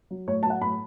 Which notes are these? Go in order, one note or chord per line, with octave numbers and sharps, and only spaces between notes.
F#3
A2 C#5
F#3 A5
F#5
A2 B5